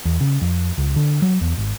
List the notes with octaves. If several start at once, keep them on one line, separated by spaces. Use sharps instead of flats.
E2
C#3
F2
C#2
D3
F#3
E2
G#1